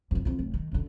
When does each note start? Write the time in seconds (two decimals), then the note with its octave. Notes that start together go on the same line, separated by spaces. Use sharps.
0.11 F2 D3
0.25 F2 F3
0.39 F1
0.54 D#3
0.72 F#2 D3